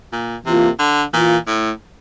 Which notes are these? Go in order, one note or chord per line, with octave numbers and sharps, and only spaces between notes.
A#2
C3 E3 A#3 F4
D3
A#2 E3 A#3 F4
A2